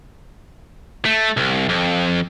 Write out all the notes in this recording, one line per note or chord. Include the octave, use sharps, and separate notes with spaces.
A3
C2
F2